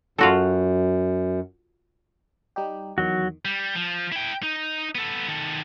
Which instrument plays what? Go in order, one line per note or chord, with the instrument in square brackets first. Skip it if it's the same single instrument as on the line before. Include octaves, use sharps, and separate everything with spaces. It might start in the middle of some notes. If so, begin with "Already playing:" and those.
[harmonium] F#2 [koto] F4 F#4 A4
[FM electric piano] G3 D#4 G4
[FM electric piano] E2 D#3 [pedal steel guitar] F#3 F#4
[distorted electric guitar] G3
F3
E4 G5
D#4
B3 A4
D#3 A4